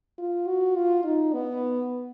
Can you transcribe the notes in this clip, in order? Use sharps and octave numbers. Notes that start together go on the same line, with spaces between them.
F4
F#4
F4
D#4
B3